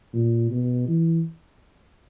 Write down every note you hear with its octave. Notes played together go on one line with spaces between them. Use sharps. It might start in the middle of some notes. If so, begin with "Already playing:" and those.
A#2
B2
E3